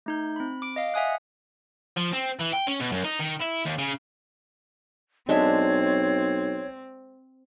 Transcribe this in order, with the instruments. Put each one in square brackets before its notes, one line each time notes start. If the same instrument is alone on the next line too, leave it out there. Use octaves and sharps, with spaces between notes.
[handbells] A3 D#4 G6
C4 B5
D6 D7
D#5 F5
E5 F#5 G#5 D#6 F#6
[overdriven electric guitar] F3
C4
E3
G5
C#4
B2
F#2
D#4
D#3
E4
D#2
C#3
[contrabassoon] B1 [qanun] G#3 D4 E5 [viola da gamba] C4 [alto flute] C#5